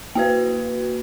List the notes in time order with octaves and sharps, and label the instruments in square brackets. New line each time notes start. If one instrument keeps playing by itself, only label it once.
[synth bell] A#3 F#4 B4